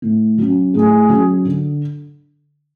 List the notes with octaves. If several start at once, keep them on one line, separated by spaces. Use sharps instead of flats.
A2
F#3 C#4
A2 G#4
F#3 C#4
D3